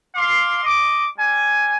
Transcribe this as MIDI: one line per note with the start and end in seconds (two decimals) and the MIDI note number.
0.15 0.64 77
0.15 0.64 84
0.15 0.64 86
0.64 1.05 75
0.64 1.05 86
1.18 1.77 55
1.18 1.77 80